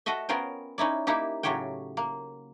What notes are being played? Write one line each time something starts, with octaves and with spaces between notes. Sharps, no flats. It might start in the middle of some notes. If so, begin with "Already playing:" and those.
F#4 A4 D#5 E5
B3 C#4 F4 A#4 C5 G5
C#4 D#4 E4 D5
A#3 D#4 E4 G4
A2 C#3 F#3 G4 C#5 G5
A#3